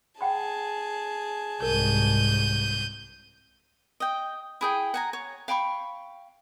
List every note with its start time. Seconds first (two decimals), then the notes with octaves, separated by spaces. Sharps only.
0.21 G#4 F#5 G5 A5 B5
1.62 C2 G#2 A#4 G6 D#7
4.00 D#5 G5
4.61 E4 G#4 G5
4.94 F#5 G#5 A#5
5.13 C#5
5.48 F5 G5 B5 C#6